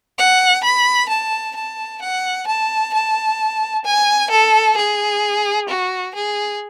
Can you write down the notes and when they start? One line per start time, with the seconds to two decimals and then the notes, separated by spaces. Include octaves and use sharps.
0.18 F#5
0.63 B5
1.09 A5
1.56 A5
2.01 F#5
2.47 A5
2.94 A5
3.85 G#5
4.30 A4
4.77 G#4
5.69 F#4
6.15 G#4